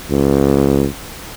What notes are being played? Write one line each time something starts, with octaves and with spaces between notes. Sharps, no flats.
C#2